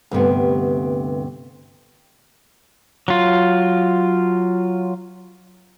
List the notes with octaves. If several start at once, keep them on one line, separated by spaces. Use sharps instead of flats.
D2 G2 C3 B3
F#3 F4